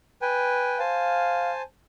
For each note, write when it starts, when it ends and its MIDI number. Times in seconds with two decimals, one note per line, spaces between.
0.22 0.79 71
0.22 0.79 79
0.22 0.79 80
0.79 1.62 72
0.79 1.52 77
0.79 1.62 80
0.79 1.62 81